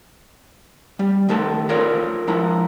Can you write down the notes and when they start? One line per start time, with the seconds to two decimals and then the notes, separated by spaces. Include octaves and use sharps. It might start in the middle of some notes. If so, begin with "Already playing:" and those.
0.99 G3
1.29 D#3 A3 G4 A5
1.69 F4 G#4 A#4 C#5 D5
2.27 F3 G#3 E4 A#5